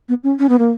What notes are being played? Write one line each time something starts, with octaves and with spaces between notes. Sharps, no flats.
B3
C#4
C#4
B3
A#3